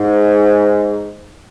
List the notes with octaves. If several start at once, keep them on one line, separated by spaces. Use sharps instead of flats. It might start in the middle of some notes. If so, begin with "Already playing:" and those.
Already playing: G#2